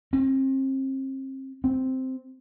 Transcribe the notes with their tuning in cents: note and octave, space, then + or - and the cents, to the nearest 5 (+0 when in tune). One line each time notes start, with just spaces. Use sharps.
C4 +35
C4 -5